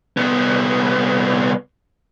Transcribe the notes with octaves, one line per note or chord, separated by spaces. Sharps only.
C2 B3